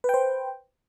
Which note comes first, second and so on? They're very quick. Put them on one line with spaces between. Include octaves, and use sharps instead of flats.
B4 G5 C5